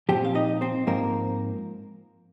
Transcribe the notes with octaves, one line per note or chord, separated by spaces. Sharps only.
A#2 F3 C4 G4 G5
F5
D#4 D#5
C4 C5
G#2 F3 A#3 C4 A#4